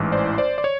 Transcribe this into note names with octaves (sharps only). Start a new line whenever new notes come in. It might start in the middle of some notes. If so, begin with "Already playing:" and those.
Already playing: A1 G#2 E3
C5 D5
C5 D5
D5
C#5